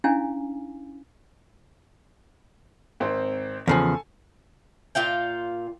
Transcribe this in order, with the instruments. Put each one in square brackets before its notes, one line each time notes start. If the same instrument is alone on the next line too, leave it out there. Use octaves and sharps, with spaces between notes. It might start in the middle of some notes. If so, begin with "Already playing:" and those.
[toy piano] C#4 D4 E4 F5 G#5
[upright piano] G#1 C4 C5
[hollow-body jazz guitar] E2 C#3 F3 [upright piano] A4 G#5
[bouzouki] A#2 F4 F5 G5